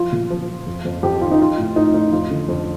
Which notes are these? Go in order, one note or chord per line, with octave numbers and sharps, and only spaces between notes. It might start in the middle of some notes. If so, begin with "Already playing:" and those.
Already playing: F3 F4
A#2
F3
F3
F2
F2
F2 G4
D#3 F4
D#4
F3 F4
A2
A2 D#4
A2 D#4
F2 F4
D3
F2